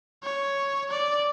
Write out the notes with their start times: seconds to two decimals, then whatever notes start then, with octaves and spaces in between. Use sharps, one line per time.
0.23 C#5
0.90 D5